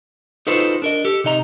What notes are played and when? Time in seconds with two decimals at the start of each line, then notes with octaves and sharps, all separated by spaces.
0.47 D#4 F4 F#4 A4 B4 C5
0.82 D4 A#4 D#5
1.05 G4 A4
1.24 C3 D#4 D#5 A#5